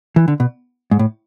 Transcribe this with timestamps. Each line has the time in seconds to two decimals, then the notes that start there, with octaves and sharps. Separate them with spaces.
0.16 E3
0.28 D3
0.40 B2
0.91 G#2
0.99 A2